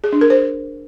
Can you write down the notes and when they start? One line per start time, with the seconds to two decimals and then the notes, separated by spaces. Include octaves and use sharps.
0.04 G#4
0.13 D4
0.21 A#4
0.30 C5